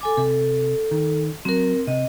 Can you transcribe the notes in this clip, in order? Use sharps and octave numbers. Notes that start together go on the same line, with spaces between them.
A4 G#5 D6
C3 A4
D#3
F#3 C4 A#4
C3 D#5